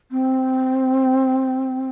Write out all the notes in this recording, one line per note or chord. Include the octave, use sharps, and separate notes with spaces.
C4